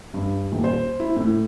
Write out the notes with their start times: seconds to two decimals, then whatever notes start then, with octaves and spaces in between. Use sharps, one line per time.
0.14 G2
0.52 D#1
0.64 C5
1.00 E4
1.16 A2